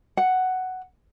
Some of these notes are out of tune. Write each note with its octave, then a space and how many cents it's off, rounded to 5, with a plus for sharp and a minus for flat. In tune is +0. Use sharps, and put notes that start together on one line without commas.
F#5 +5